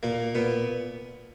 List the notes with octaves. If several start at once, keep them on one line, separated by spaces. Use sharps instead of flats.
A#2 A#3
A#2 B3